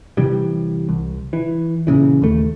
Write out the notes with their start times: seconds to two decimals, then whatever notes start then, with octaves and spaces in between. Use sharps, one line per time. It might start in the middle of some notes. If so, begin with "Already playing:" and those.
0.17 C3 E3 G3
0.89 C2
1.33 E3
1.87 A#2 C#3 E3
2.22 D#2 A3